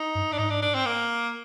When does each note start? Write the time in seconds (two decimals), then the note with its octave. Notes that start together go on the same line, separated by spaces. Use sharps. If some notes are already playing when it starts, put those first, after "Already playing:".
Already playing: D#4
0.15 G2
0.32 D4
0.38 G#2 D#4
0.50 D4
0.62 D4
0.75 C4
0.86 A#3